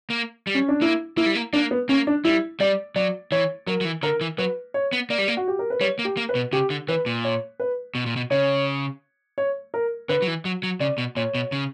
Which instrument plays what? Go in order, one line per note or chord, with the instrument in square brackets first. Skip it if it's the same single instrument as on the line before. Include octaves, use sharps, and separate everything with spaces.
[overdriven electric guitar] A#3
G3
[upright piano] C#4
D4
[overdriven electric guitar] A#3 [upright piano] E4
[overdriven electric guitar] A#3 [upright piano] E4
[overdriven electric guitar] G3
A#3
[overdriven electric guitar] A#3 [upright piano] D4
[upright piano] B3
[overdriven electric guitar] A#3 [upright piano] C#4
[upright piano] D4
[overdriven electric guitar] G3 [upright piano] E4
[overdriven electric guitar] G3 [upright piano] D5
[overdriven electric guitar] F#3 [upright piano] D5
[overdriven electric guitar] E3 [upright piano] C#5
[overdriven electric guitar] F#3 [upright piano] A#4
[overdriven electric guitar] F#3
E3
[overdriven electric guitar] D3 [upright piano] A#4
[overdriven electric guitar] E3
[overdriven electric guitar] F#3 [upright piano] B4
[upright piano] C#5
[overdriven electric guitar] B3
[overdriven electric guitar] A#3 [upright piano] D5
[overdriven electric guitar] G3
A#3
[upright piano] F#4
G4
A#4
B4
[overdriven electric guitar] G3 [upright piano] C#5
[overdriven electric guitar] A#3
[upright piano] G4
[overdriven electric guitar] A#3
[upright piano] B4
[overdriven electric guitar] B2
[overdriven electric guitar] C#3 [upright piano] G4
[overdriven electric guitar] D3
[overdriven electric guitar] E3 [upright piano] B4
[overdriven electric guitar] A#2
[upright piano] C#5
B4
[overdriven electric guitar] B2
A#2
B2
[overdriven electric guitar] C#3 [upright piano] C#5
[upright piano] C#5
A#4
[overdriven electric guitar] D3 [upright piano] B4
[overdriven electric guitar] F#3
E3
F#3
F#3
[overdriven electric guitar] C#3 [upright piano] D5
[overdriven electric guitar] B2
[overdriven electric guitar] A#2 [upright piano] C#5
[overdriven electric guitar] B2
C#3